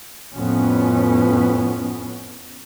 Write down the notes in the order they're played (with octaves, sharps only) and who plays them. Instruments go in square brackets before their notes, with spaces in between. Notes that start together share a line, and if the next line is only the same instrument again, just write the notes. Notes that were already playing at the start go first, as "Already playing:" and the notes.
[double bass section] F2 A2 B3 C#4